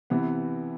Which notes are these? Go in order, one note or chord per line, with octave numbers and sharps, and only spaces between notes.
C3 E3 B3